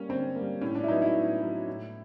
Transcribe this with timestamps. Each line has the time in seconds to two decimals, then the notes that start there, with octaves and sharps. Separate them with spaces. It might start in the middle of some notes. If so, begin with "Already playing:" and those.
Already playing: G3 A#3 C#4
0.09 D3 C4
0.36 G3 A#3
0.61 A2 C#4
0.75 D4
0.84 E4
0.88 F#3 B3 D#4
1.02 E4
1.15 A2
1.41 F#3 B3
1.68 A2